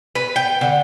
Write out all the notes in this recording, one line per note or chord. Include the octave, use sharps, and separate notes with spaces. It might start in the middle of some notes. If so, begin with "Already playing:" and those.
B4
G5
D3